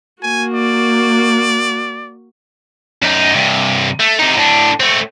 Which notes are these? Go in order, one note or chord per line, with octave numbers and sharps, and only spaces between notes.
A#3 F#4 G#5
D5
F#2 D#4
G2 C3
A3
C3 D#4
A2 D4
A3 C4